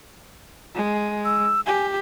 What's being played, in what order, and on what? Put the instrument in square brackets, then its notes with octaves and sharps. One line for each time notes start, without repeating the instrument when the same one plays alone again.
[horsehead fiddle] G#3
[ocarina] E6
[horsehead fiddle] G4 [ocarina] G#5